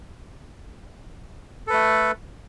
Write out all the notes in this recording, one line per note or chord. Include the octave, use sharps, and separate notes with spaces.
A3 A4 B4